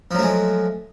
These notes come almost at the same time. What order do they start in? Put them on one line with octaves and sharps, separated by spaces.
F3 F#3 A3 G#3